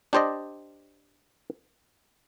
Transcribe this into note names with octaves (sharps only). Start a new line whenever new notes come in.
D4 G4 C5 D5 D#5